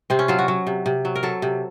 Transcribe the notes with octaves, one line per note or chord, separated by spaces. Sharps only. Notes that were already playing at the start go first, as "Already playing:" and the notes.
C3 C4
C#4
F#3 F4
F#4
F#3
C3
C3
F#3
A#4
F#3 A4
C3